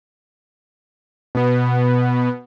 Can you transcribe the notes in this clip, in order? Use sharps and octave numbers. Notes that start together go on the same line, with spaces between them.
B2 B3